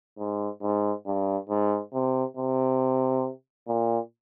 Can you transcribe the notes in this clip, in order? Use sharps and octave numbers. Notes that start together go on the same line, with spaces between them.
G#2
G#2
G2
G#2
C3
C3
A#2